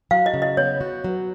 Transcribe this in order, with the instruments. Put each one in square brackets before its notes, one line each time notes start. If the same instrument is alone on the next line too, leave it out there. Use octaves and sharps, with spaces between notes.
[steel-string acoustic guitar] F#3 [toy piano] F5
[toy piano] D#5
[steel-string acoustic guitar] C#3
[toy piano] D#5
[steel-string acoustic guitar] B3 [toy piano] C#5
[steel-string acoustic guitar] F#4
F#3